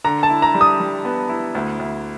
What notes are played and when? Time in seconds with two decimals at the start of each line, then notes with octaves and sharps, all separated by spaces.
0.04 D3 A#5
0.23 A5
0.30 E4
0.42 A#5
0.55 G3
0.61 D#6
0.80 G3
1.05 B3
1.29 E4
1.55 D2
1.79 D2